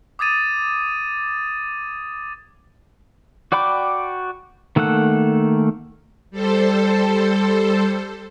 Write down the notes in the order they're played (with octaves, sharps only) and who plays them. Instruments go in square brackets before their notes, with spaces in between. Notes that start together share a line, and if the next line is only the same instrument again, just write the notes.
[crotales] D6 D#6 G#6 A6 D#7
[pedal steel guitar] F#4 D5 G5 B5 D6
D#3 A3 A#3 A4 F#5
[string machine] G3 A4 C5